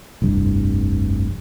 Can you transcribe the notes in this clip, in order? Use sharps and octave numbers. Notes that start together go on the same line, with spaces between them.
F1 C2 G2